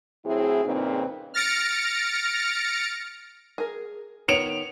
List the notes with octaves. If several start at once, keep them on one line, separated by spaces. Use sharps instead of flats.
A2 F#3 C4 E4 G#4
F2 A#2 C#3 C4 D#4 B4
F6 A6 A#6 C#7 D7
G#4 A#4
D#3 B3 C#5 C#7 D7 F7